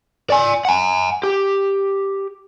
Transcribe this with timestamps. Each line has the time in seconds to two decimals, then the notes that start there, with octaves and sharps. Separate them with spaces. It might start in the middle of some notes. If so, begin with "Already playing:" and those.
0.30 D5 G#5
0.65 F#5 G#5
1.23 G4